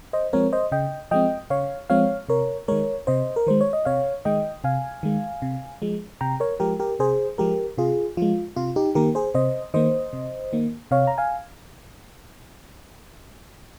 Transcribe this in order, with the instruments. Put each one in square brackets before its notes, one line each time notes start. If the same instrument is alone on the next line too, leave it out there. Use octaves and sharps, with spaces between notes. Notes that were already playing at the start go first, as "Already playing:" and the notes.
[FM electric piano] C5 D#5
F3 G#3 C4 A#4 C#5
C5 D#5
C#3 D#5 G5
F3 G#3 C4 D#5 G5
C#3 C#5 F5
F3 G#3 C4 C#5 F5
C3 A#4 C#5
D#3 G#3 A#4 C#5
C3 C5 D#5
A#4
D#3 G#3 C5
C#5
D#5
C3 C#5 F5
D#3 G#3 D#5 G5
C3 F5 G#5
D#3 G#3
C3
F3 G#3
C3 G5 A#5
A#4 C#5
F3 G#3 G4 A#4
G4 A#4
C3 G#4 C5
F3 G#3 G4 A#4
C3 F4 G#4
F3 G#3 F4
C3 F4
D#4 G4
D#3 A#3 G4 A#4
G#4 C5
C3 C5 D#5
D#3 A#3 C5 D#5
C3
D#3 A#3
C3 C#5 F5
A#5
F5 G#5